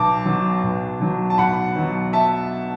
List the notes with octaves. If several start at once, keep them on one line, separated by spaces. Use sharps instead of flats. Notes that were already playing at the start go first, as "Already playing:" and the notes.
Already playing: B1 A5 D6
B2 F#3
B1
B2 F#3
A5
B1 F#5 B5
B2 F#3
E5 A5